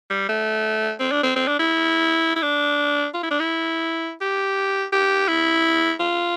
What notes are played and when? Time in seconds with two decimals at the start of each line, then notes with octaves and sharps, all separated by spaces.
0.10 G3
0.28 A3
1.00 C4
1.12 D4
1.23 C4
1.36 C4
1.47 D4
1.59 E4
2.36 E4
2.42 D4
3.14 F4
3.23 E4
3.31 D4
3.39 E4
4.21 G4
4.92 G4
5.28 E4
6.00 F4